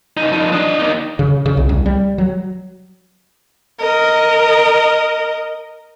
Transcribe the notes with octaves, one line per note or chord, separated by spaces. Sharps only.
C#3 D#4
F3 D#4
D4 D#5
A#3 D#4
C#3
C#3
C2
C2
G3
F#3
A#4 D#5